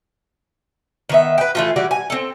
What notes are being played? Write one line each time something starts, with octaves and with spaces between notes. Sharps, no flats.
D#3 B3 E5
B4 G5
E3 A3 F4
E3 G3 F#4 G4
G#5
C4 A4